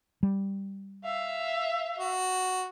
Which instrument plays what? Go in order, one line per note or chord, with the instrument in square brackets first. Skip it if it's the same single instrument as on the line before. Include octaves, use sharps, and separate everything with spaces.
[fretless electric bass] G3
[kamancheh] E5 F5
[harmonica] F#4